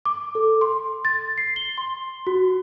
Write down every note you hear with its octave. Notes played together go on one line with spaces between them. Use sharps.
D6
A4
C6
A6
C7
G7
C6
F#4